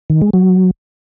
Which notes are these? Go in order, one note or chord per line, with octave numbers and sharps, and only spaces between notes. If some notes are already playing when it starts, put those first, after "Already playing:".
D#3
G#3
F#3